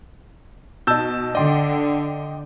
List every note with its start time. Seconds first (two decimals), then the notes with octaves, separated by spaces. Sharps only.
0.87 B2 D#4 A5 E6 G6
1.35 D3 D5 D#5 G5 C6